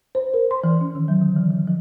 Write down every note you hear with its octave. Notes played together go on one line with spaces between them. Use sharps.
C5
A#4
C6
E3
C#4
D#3
F#3
D3
E3
E3
F3